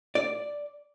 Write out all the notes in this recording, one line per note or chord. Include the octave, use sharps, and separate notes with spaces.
D5